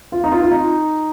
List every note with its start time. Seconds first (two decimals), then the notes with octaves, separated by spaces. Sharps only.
0.12 F4
0.24 D#4
0.32 F4
0.42 F4
0.52 D#4